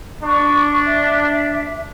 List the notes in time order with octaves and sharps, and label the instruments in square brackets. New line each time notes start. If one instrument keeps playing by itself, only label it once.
[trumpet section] D4 [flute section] C#6
[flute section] E5